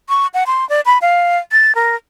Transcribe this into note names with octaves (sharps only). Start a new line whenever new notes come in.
C#6
F#5
C6
D5
B5
F5
A6
A#4